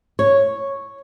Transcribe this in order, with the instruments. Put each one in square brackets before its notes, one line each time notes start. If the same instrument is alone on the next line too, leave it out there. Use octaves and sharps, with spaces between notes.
[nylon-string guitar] C#5